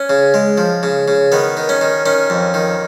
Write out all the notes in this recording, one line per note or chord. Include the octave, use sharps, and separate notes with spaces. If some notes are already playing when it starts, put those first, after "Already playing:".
Already playing: C#4
C#3
G#3
F3
C#3
C#3
D#3 B3
D#3
C#4
D#3
D#3 C#4
F2
D#3